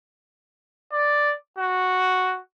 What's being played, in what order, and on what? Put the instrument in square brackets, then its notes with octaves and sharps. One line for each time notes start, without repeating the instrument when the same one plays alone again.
[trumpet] D5
F#4